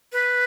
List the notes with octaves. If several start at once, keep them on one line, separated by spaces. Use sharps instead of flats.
B4